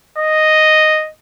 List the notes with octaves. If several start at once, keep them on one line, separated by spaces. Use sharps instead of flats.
D#5